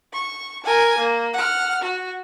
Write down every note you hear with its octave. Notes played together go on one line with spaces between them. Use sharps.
C#6
A#4 G#5
A#3
F#5 F6
F#4